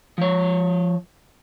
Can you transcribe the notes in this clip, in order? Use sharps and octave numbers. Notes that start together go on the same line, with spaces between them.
F3 C#5